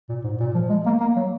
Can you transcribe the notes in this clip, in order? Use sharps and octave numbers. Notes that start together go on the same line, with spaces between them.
A#2
G#2
A#2
F3
G#3
A#3
A#3
F#3